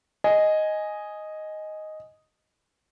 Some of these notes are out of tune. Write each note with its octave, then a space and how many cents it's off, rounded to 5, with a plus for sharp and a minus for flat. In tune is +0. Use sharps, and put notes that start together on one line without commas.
D#5 +0 G#5 +0